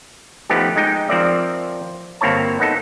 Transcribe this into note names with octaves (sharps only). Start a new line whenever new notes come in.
F3 A3 B3 D#4 G4
G#3 D#4 G5
F3 C4 A#4 D5 E5
G1 A#3 C4 E4 C#5 A5
B3 D#4 A4